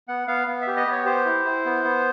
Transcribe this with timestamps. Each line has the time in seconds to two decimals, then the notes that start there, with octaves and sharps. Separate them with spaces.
0.08 B3 F#5
0.28 B3 F5
0.48 B3
0.61 E5
0.67 G4
0.77 D#5
0.87 B3
0.92 C#5
1.06 G4 C5
1.26 E4
1.45 E4
1.65 B3
1.85 B3